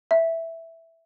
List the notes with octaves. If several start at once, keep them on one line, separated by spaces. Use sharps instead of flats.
E5